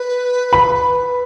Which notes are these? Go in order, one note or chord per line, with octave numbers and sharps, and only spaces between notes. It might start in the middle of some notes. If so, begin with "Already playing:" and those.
Already playing: B4
B5